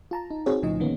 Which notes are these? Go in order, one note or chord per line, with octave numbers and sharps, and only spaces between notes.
F4 A5 A#5
D#4
C4 D#4 F#4 G#4 C#5
B1 A2 C#3 F3 D#4 D#5
D3 D#3 A#3 B3 C#4